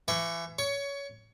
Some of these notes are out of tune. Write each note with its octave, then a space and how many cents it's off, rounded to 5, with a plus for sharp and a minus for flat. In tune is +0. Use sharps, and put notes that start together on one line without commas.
E3 +30 G5 +0 C#6 +0
C#5 +20 C#6 +15